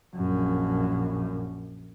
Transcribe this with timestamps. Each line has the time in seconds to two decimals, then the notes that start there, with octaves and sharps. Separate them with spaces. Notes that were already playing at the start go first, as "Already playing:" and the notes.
0.16 A#1 F#2